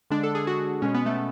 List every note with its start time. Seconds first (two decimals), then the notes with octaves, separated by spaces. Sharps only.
0.10 D3 G#3 D4
0.23 A4
0.35 G#4
0.47 F#4
0.82 B2 G#3 C#4
0.94 B3
1.06 A3